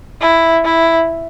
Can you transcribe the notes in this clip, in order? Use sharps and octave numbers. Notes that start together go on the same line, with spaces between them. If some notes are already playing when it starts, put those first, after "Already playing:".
E4
E4